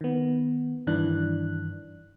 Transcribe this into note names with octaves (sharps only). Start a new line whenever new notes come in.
D#3 B3
G2 D#3 E3 D4 F#6